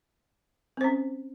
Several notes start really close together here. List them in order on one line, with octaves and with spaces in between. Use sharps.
C4 C5 C#4